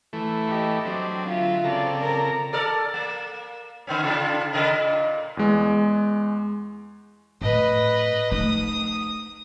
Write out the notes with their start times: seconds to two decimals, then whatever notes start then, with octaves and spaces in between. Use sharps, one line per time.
0.13 E3 A3
0.48 G4 D#5
0.85 F#3 C4 D4
1.26 D3 F#3 F4 E5
1.64 C#3 C4 A4 D5 A#5
2.01 A#4
2.53 A4 A#4 D5
2.94 A#3
3.87 D3 B3 C#4
4.03 C#3 D4 F4
4.53 C#3 A#4 D#5
4.75 A#2
5.37 E2 G#3
7.42 A2 B4 D#5
8.31 A3 D#4 D#6